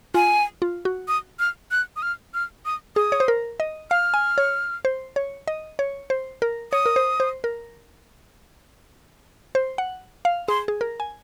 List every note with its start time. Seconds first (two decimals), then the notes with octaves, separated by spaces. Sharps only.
0.14 F4 G#5
0.62 F4
0.85 F#4
1.08 D#6
1.39 F6
1.71 F#6
1.96 D#6
2.02 F6
2.34 F6
2.65 D#6
2.96 G#4 D#6
3.12 C#5
3.20 C5
3.28 A#4
3.60 D#5
3.91 F5 F6
4.14 G#5
4.38 C#5
4.85 C5
5.16 C#5
5.48 D#5
5.79 C#5
6.10 C5
6.42 A#4
6.72 C#5 D#6
6.86 A#4
6.96 C5
7.20 C5
7.44 A#4
9.55 C5
9.78 F#5
10.25 F5
10.48 G#4 C6
10.68 G#4
10.81 A#4
11.00 G#5